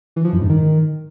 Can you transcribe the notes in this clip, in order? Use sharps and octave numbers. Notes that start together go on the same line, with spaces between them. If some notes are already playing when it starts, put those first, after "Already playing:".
E3
F3
F#2
G#2
D#3